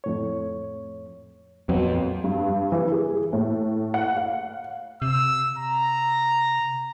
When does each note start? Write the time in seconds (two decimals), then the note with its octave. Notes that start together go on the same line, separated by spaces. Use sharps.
0.04 F2 A2 C#5
1.69 F2 A#2 F#3 B3
2.24 G2
2.72 E3
2.92 G#4
3.33 A2
3.94 F#5
4.17 F5
5.02 C3 E6
5.58 A#5